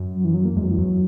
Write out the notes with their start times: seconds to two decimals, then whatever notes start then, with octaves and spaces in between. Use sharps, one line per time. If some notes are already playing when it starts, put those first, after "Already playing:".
Already playing: F#2
0.14 F#3
0.25 E3
0.34 F#3
0.45 A#3
0.56 E2 G#3
0.64 F#3
0.67 F#2 E3
0.77 E2 F#3